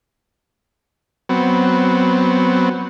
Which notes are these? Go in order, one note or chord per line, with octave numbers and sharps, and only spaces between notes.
F#3 B3 C4